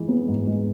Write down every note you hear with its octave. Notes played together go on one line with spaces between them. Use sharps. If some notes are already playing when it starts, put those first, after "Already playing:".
Already playing: E3 G#3
B3
G#2
G#3